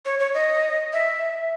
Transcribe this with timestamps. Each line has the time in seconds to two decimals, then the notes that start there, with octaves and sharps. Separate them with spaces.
0.05 C#5
0.19 C#5
0.34 D#5
0.93 E5